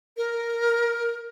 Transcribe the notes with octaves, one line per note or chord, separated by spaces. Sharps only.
A#4